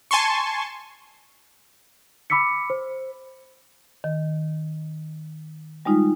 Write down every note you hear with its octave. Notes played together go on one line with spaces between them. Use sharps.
G#5 A5 C6 C#6
B5 D6 E6 B6 C#7
C5
D#3
G3 G#3 D#4 F4